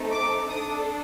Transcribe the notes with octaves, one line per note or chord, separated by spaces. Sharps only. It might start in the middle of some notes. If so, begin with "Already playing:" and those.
Already playing: A3 C4 D#4 A4
D6
D4 A4 D#6